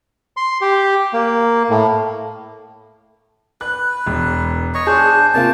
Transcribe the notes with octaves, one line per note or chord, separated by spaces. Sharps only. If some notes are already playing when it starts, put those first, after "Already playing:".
C6
G4
A#3
A2
B4 F#6
E1
C#5 D#5 C#6
D4 G#4 C5
C3 A#3 F4 A5